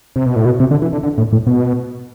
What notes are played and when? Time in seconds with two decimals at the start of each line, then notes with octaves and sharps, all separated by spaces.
0.16 C3
0.26 B2
0.36 A2
0.45 B2
0.60 C3
0.71 D3
0.82 E3
0.93 D3
1.03 D3
1.18 A2
1.33 A2
1.47 B2